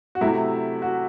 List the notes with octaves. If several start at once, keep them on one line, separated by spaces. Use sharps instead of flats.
F#4
C3 F#3 A3 E4
F#4